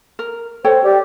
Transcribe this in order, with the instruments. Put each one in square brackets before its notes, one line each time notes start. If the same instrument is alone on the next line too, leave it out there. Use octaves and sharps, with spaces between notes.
[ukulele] A#4
[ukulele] A4 C#5 G5 [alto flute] C5
[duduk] G4 [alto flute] D5